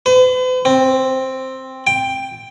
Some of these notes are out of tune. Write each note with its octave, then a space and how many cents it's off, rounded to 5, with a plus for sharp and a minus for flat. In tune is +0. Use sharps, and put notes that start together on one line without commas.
B4 +45
C4 +5
G5 +10